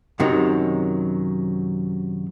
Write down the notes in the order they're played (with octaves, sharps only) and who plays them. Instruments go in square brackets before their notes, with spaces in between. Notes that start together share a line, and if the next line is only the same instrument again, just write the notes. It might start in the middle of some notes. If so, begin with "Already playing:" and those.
[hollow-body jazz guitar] F#2 C3 D#3 F#3